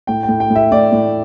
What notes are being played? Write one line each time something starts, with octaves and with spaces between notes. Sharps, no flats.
A2 G5
G5
A2
G5
A2
E5
A2 D5
A2